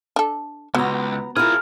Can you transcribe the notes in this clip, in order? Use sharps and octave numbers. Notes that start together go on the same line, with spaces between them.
D4 A4
C#2 F#3 B3 A#5
E4 F4 G#4 A#4 F6